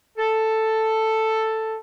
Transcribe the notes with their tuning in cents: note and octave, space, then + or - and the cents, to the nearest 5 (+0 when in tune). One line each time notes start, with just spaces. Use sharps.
A4 +5